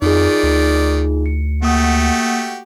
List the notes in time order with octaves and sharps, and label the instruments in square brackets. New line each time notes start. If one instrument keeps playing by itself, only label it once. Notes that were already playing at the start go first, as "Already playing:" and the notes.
[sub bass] F2 [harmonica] D#3 D5 [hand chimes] D#4 F4 G#4
[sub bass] D2
[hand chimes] C#7
[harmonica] A3 F#4 G4 [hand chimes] A#3 F#5 D#6